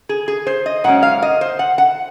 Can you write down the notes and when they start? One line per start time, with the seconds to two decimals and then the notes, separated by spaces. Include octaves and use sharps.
0.09 G#4
0.28 G#4
0.47 C5
0.66 D#5
0.84 G#2 F#3 A#3 C#4 F#5
1.03 F5
1.22 D#5
1.41 C5
1.59 F#5
1.78 F#5